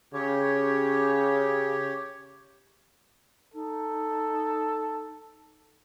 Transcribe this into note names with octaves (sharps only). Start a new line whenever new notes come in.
C#3 G4 C#5
D#4 A4